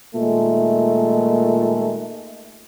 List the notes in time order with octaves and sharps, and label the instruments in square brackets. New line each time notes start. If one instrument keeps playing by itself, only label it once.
[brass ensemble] A#2 D#3 G#3 A3